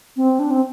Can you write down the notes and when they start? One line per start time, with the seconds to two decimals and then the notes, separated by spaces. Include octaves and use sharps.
0.17 C4
0.39 D4
0.51 C4